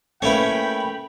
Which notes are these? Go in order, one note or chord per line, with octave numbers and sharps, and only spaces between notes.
A3 A#3 C#4 E4 B4 G5 B5